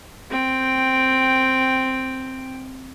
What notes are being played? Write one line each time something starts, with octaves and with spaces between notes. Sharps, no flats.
C4 G5